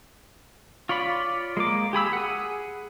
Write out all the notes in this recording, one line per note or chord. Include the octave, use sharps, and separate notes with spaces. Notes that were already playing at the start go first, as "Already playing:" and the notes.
F4 C#5 D5 B5
G#3 A#3 D6
G4 G#4 B5 E6
G#4 F#5